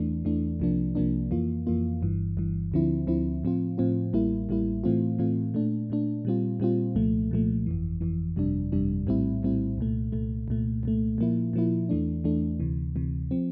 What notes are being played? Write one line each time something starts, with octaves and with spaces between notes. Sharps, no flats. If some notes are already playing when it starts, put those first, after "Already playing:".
Already playing: E2 E3 A3 D4
E2 E3 A3 D4
C2 C3 F3 A#3 D4
C2 C3 F3 A#3 D4
F2 E3 A#3 F4
F2 E3 A#3 F4
G1 G2 E3
G1 G2 E3
D2 D3 F3 C4 E4
D2 D3 F3 C4 E4
A2 F3 C4 F4
A2 F3 C4 F4
A1 A2 G3 A#3 E4
A1 A2 G3 A#3 E4
A2 E3 A3 C4 F4
A2 E3 A3 C4 F4
A#2 A3 D4
A#2 A3 D4
A#2 G3 C4 F4
A#2 G3 C4 F4
C2 A#2 F3 A3
C2 A#2 F3 A3
G1 F2 E3
G1 F2 E3
G1 F2 C3 G3 D4
G1 F2 C3 G3 D4
A#1 A2 G3 C4 E4
A#1 A2 G3 C4 E4
C2 A#2 A3
C2 A#2 A3
C2 A#2 A3
C2 A#2 A3
A#2 F3 A#3 E4
A#2 F3 A#3 E4
E2 E3 A3 D4
E2 E3 A3 D4
D2 C3 E3
D2 C3 E3
F3 C4